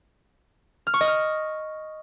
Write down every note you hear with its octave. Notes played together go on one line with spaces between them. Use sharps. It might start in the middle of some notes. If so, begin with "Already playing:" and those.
F6
C#6
D#5
F6